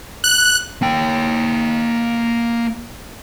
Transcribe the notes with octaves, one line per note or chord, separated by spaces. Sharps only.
F#6
A#3 G5